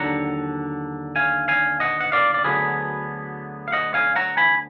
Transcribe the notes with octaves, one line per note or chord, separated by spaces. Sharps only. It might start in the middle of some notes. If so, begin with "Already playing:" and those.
Already playing: D#2 D3 F#3 D4 F#5 A#5
F5 G#5
F5 G#5
D#5 F#5
F#5
D5 F5
D5
D2 D3 F#3 B3 G#4 B4
F5
D#5 F#5
F5 G#5
F#5 A#5
G#5 B5